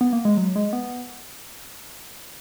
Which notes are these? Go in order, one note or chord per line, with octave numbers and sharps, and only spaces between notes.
B3
A#3
G#3
F#3
G#3
B3